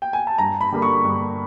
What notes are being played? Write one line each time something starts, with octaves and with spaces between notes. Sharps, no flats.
G5
G#5
A5
G2 A#5
B5
D3 G3 A#3
C#6
G2